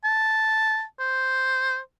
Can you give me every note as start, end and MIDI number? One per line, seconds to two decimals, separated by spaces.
0.04 0.83 81
0.99 1.78 72